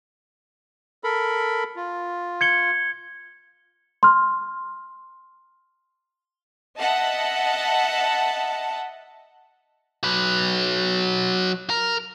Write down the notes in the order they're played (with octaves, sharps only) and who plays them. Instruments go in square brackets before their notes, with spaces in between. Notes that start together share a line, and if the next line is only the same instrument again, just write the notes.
[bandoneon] A4 A#4 B5
F4
[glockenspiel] G#6 C#7 G7
[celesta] C6 F6
[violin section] D#5 E5 F#5 A5
[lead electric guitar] F#3 B4
A#4